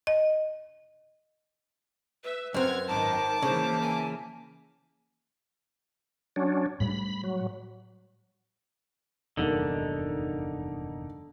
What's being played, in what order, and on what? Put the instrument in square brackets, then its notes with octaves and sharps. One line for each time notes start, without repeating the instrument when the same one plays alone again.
[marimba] D#5
[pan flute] B4 [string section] E5
[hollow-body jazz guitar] F#2 C4 [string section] F#5 G#6 [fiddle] F6
[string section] G#1 D#3 B4 [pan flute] C5 [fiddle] A5 D6
[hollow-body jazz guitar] C#3 [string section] E3 A#3 [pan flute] C5
[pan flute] G#5
[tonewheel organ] F#3 C#4 D4
[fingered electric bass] A2 G3 [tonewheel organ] B5
[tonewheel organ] F#3
[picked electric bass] F1 E2 G2 [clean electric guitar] D3 [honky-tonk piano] A#3 D#4